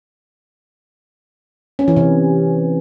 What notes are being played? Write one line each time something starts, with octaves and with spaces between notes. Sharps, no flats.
C#4
E3
C3